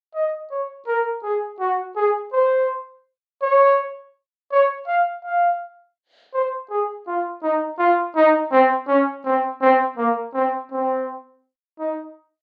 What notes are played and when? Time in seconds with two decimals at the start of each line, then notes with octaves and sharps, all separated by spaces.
0.15 D#5
0.51 C#5
0.87 A#4
1.24 G#4
1.60 F#4
1.96 G#4
2.33 C5
3.42 C#5
4.52 C#5
4.87 F5
5.24 F5
6.34 C5
6.71 G#4
7.07 F4
7.43 D#4
7.79 F4
8.16 D#4
8.52 C4
8.88 C#4
9.25 C4
9.62 C4
9.97 A#3
10.34 C4
10.71 C4
11.80 D#4